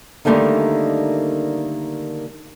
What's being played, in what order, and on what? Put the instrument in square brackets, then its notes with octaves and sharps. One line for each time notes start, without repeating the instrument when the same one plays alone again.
[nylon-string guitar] D3 D#3 G3 A3 A#3 D#4